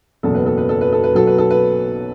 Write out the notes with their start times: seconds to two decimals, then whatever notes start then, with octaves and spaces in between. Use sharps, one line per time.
0.23 F#1 E2 B2 F#3 A4
0.34 B4
0.46 A4
0.58 B4
0.69 A4
0.81 B4
0.93 A4
1.04 B4
1.13 B1 B2 F#3 A4
1.27 B4
1.38 A4
1.51 B4